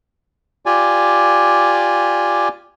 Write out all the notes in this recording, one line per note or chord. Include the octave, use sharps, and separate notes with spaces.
F4 G4 D5 G#5